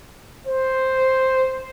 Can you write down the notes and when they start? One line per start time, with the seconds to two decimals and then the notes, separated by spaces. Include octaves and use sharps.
0.47 C5